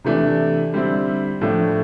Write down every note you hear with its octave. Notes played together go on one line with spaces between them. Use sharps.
C3 E3 A3 D4
D3 G3 C4 E4
A2 F3 A3 D4